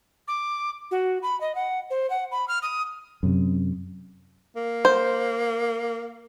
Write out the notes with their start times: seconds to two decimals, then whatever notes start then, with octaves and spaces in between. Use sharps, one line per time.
0.28 D6
0.91 F#4
1.23 B5
1.41 D#5
1.55 F#5
1.90 C5
2.10 F#5
2.32 B5
2.48 F6
2.62 D#6
3.23 F#2 C3
4.56 A#3
4.85 C5